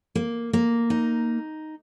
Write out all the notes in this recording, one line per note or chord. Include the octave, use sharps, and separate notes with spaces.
A#3
A#3
D#4